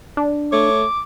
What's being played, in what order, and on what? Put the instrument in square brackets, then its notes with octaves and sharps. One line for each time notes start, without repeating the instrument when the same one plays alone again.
[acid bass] D4
[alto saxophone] A3 [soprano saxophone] C#5 [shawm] D6